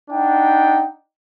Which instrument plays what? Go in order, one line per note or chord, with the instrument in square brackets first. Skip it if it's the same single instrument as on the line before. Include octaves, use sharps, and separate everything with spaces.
[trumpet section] D4 D#4 F#5 G5